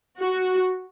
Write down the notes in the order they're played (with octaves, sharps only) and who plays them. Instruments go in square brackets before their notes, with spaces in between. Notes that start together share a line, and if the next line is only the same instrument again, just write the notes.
[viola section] F#4